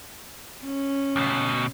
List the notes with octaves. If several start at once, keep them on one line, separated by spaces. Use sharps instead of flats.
C#4
D2 B2